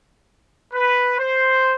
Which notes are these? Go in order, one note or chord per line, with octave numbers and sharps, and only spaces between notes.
B4
C5